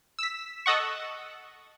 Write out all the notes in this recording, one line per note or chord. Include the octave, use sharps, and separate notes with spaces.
E6 B6
A4 D#5 F#5 C#6